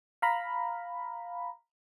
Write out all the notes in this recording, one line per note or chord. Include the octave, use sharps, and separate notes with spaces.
F5 A#5 B5